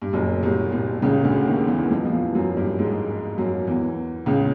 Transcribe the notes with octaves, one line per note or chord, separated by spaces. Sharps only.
G2
F#1 F#2
C2 C3
C2 C3
C#2 C#3
D2 D3
D#2 D#3
E2 E3
F2 F3
F3
E2 E3
F#2 F#3
G2 G3
G#2 G#3
F#2 F#3
E2 E3
C#2 C#3